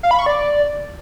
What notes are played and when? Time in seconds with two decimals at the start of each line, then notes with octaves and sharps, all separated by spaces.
0.03 F5
0.11 B5
0.19 C#6
0.26 D5